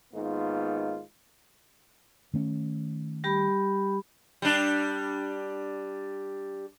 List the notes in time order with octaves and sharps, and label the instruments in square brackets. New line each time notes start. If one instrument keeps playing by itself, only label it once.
[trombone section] G#2 D#3 A#3 B3 F4
[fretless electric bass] D#3 A3 C#4
[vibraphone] G3 G4 B5
[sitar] G3 D4